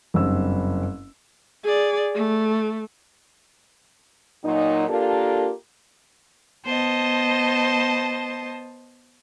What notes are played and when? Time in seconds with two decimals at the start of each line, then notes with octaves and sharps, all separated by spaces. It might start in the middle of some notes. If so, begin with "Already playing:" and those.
0.14 F#1 G2 C4 E6
1.63 G#4 D5
2.14 A3
4.44 A#2 F#3 D#4
4.88 A#3 D4 F4 G4 A4 A#4
6.66 B3 C5 D#5 A5